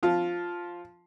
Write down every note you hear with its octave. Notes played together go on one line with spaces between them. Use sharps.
F3 F4